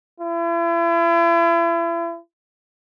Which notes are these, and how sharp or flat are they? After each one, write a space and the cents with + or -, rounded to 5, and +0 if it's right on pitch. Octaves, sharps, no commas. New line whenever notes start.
E4 +40